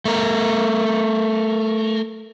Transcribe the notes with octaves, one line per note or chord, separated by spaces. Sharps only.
A3 A#4